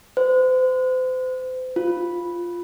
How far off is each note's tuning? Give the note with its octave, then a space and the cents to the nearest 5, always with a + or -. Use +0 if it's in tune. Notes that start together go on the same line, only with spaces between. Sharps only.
C5 -40
F4 +0